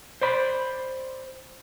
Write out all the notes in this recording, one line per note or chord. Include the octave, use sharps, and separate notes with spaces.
C5 D5 B5